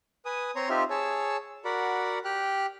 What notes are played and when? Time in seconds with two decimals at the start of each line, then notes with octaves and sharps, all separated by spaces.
0.25 B4 G#5 D#6
0.56 C4 C#5 A#5 C6
0.69 C4 D#4 F4 G4 E5 F6
0.90 G#4 C#5 A5 E6
1.65 F#4 A#4 D5 F#5 B5
2.25 G4 G5 F6 F#6